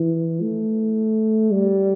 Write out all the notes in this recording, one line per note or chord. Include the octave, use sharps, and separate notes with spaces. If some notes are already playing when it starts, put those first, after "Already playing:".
Already playing: E3
A3
G3